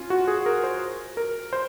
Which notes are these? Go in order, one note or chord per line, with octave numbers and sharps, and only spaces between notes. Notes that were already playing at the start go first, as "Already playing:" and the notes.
Already playing: C#4 F4
F#4
G#4
A#4
C5
A#4
C5